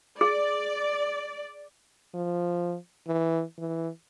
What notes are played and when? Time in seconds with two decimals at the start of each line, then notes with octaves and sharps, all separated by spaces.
0.21 G#4 D5
2.14 F3
3.07 E3
3.58 E3